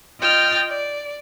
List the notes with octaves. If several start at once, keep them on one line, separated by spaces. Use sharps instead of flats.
F4 D#5 G5 F6 A6
D5